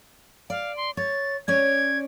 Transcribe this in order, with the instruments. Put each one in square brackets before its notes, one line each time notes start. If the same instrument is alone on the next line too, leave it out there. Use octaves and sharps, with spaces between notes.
[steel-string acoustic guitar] D5 [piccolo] F5
[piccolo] C6
[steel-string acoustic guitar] C#5 [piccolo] A6
[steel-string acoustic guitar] C#4 C#5 D5 [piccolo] G#6